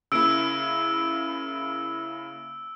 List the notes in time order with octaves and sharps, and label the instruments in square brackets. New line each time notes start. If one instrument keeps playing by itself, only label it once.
[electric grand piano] C#3 A#3 E4 [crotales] E6 D7